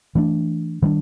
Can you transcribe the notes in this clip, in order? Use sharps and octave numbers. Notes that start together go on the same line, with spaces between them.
E3 A3 D4
D#3 G3 B3 D4